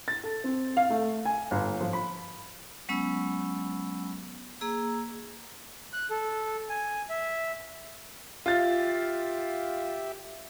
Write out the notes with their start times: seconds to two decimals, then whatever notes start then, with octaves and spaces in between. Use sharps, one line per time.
0.08 A6
0.24 A4
0.44 C4
0.77 F5
0.90 A3
1.25 G#5
1.51 G1
1.81 F3
1.93 B5
2.89 F#3 G#3 B3 C#4 B5 E6
4.61 A#3 G#4 A#5 E6
5.93 F#6
6.10 A4
6.69 G#5
7.10 E5
8.46 F4 G4 E5 A6